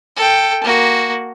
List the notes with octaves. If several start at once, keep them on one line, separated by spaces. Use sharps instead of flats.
A4 G5
A#3 F#4